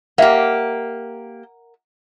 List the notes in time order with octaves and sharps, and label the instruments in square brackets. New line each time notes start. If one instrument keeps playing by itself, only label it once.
[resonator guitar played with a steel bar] A#3 G4 [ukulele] A#4 E5 F#5